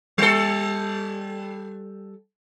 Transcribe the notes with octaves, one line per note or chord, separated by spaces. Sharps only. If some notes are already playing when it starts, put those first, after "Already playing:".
G3 A4